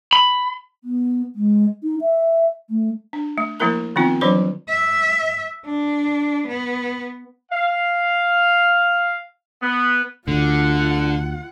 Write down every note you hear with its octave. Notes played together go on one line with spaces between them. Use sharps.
B5
B3
G#3
D#4
E5
A3
D4
A3
F3 A3 A#3 E4 A#4 A#5
D#3 F3 B3 C4 D#4 F4
E3 F#3 G3 D4 C5 B5
E5
D4
B3
F5
B3
D2 D3 F4 F#5